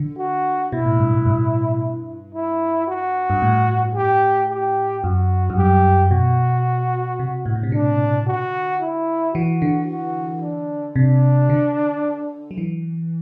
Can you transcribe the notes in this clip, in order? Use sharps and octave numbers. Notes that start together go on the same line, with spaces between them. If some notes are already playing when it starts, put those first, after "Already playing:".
Already playing: D3
F#4
B2 E4
A2
G2
G2
G2
E4
F#4
G2
A2
G4
G4
F#2 F#4
F#2
G2 G4
B2 F#4
C3
A2
B2
C3
D3 D4
F#4
E4
E3 F#4
D3
F#4
D4
C3 D4
D3
F#3
E3